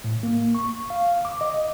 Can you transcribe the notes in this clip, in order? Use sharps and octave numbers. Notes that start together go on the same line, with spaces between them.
A2
A#3
C#6
F5
D6
D#5